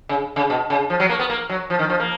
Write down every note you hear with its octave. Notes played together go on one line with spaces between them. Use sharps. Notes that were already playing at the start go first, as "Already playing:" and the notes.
C#3
C#3
B2
C#3
F3
F#3
A#3
B3
A#3
F#3
F3
D#3
F3
A#3